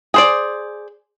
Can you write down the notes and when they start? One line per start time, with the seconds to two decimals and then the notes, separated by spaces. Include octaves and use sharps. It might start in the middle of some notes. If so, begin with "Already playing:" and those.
0.14 G#4 C5 D5